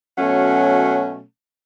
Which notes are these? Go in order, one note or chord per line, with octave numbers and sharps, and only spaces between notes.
B2 F#3 A3 C#4